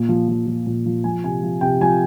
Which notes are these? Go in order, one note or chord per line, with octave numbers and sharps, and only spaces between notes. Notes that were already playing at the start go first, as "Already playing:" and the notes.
Already playing: A#2
F3
F3
F3
A#2
F3
F3 G#5
C3 G#5
F3
C3 G5
F3 G#5